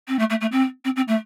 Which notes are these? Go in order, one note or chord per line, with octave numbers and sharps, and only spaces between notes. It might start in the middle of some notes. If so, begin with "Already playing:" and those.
C4
A3
A3
A3
C4
C4
C4
A3